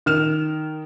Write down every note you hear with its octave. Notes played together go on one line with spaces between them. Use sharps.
D#3 F6 E7